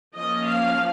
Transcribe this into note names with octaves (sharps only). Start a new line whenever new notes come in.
F3 A#3 C#4 D#5
F5